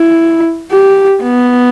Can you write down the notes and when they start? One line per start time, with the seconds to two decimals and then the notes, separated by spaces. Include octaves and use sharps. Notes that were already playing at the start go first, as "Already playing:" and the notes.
Already playing: E4
0.72 G4
1.22 B3